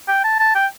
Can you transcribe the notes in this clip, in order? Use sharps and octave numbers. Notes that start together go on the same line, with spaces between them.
G5
A5
A5
G5